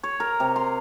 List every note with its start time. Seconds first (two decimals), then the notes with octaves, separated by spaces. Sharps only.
0.03 C#5
0.20 A#4
0.40 C3
0.56 C6